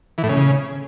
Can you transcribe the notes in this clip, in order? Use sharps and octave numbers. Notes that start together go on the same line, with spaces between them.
E3
A2
C#3